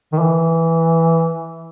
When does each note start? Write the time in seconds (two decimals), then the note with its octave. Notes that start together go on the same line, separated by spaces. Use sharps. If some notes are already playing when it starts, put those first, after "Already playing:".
0.13 D#3
0.20 E3